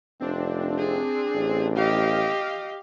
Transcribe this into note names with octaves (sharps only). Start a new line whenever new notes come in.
F1 C4 D4
G#4
A1
G4 D#5 F5